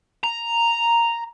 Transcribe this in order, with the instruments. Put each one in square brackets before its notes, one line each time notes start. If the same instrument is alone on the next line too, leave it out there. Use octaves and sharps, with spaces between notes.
[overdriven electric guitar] A#5